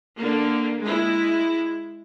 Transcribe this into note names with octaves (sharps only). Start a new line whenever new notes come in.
D3 A#3
G#3 E4